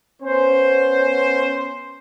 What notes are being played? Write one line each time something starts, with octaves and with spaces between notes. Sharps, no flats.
B3 C#4 C5